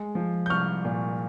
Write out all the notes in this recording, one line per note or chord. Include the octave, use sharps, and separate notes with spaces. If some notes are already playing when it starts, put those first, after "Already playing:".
Already playing: G#3
F3
G6
C2 C#6 F6
A#2